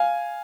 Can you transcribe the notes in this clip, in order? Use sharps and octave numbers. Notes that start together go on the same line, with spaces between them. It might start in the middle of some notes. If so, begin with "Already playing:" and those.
Already playing: F5 G#5